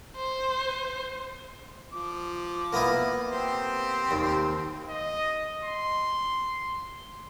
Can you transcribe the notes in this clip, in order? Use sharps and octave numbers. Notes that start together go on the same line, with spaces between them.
C5
F3 D6
A#3 B3 E4
C4 G4 C5
D#2
D#5
C6